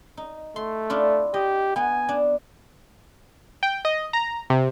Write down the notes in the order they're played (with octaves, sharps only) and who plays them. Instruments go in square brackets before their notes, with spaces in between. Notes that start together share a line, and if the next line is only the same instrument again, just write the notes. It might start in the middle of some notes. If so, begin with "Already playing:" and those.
[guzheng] D#4
[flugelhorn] A3 [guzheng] C6
[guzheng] D4 E4 F4
[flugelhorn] G4 [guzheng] D#5
[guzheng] B3 [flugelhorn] G#5
[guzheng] D4
[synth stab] G5
D#5
A#5
C3